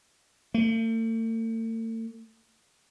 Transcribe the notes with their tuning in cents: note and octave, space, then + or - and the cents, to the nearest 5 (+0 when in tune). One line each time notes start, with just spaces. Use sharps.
A3 +45